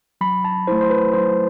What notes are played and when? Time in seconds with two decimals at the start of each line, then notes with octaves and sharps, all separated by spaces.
0.21 F#3 B5
0.45 A5
0.67 A3 E4 C5
0.81 C5
0.90 B4
1.14 F#3 C5